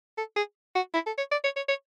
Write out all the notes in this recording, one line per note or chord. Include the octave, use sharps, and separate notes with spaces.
A4
G#4
F#4
E4
A4
C#5
D5
C#5
C#5
C#5